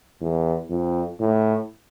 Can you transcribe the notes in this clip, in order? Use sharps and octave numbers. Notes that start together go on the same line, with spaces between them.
E2
F2
A2